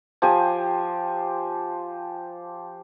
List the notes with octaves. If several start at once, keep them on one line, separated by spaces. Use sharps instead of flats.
F3 G4 C5 G#5